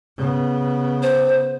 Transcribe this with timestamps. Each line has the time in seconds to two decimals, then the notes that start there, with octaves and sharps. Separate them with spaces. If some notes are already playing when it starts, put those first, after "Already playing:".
0.17 C#3 B3
1.03 C5